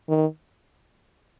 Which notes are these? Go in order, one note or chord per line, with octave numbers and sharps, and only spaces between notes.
D#3